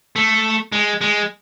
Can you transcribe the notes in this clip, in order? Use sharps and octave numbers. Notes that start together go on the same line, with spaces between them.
A3
G#3
G#3